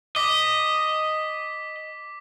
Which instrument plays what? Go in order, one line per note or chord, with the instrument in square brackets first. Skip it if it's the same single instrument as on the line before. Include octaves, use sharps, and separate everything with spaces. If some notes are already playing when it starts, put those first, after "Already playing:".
[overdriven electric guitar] D#5 [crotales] D6 B6